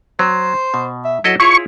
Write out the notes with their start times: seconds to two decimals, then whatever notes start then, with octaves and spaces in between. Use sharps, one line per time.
0.19 F#3 C5
0.74 B2
1.04 E5
1.24 F#3 E4 A4 D#5
1.40 E4 F4 G#4 C#5 C#6